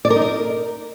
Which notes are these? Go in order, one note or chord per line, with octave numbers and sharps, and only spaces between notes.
D5
A#4
D#4
A#4